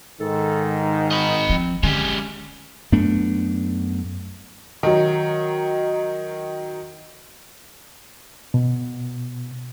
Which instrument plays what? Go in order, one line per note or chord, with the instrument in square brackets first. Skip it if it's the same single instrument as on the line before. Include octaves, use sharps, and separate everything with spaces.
[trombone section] G#2 D#3 [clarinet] A4
[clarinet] D#4
[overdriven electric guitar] D#5 B5
[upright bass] F3 [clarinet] C4
[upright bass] D3 [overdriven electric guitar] G#3 G4 [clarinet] C#4
[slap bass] F#2 A3 B3 D4
[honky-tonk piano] D#3 F#3
[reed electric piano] B2